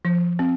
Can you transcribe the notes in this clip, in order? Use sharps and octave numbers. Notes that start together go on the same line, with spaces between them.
F3
C4